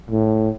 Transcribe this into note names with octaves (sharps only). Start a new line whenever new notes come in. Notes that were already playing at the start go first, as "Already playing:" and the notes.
A2